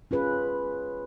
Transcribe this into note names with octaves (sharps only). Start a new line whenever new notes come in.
C#4 F4 G#4 B4